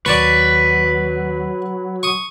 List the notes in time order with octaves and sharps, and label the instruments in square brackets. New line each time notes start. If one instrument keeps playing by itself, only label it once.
[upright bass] D#2 [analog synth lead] F#3 [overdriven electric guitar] B4 [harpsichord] D5 A5 C#6
[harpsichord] C#6 D#6